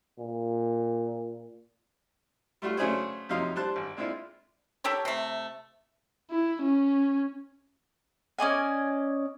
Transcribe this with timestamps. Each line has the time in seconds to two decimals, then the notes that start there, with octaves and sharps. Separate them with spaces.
0.19 A#2
2.62 G3 A3 F4 F#4
2.77 C#3 F#3 A3 D4 G#4 C5
3.29 F2 C3 F#3 D#4 F5 C6
3.56 G3 D4 C5 A5 F#6
3.76 G#1
3.97 G#3 C4 D4 E4 F4
4.84 G4 A4 A#4 C#5
5.05 C3 A3
6.30 E4
6.62 C#4
8.39 C#4 D5 D#5 G#5